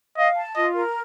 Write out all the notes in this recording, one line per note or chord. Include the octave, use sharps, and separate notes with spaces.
D#5 F5
A5
F4 D#5
A#4